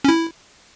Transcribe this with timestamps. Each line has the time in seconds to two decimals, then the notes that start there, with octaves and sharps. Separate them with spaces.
0.04 C#4
0.08 E4